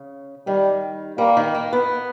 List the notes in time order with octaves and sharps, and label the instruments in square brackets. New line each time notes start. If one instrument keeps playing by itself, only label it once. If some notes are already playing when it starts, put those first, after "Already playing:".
Already playing: [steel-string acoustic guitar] C#3
[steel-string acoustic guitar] D#3 [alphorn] G3
[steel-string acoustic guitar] G3 [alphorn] A#3
[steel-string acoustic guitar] D#3
A#3
B3